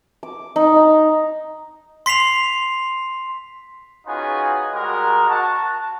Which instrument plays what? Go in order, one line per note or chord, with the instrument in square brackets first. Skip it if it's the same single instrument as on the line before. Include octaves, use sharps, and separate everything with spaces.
[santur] D6
D#4
A#5
[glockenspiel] C6 B6 C7 F7
[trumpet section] C#4 D#4 F4 F#4 G#4 B4
G3 G#3 F#4 A#4
F#4 A5